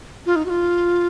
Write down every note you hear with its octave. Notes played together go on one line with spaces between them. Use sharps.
F4
D#4
F#4
F4